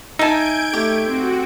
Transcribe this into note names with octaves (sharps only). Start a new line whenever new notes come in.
D#4 E5 G#5 A5 G6 G#6 D7
A3 G4
C4 F#4